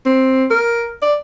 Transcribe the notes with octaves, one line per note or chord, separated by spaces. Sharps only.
C4
A#4
D5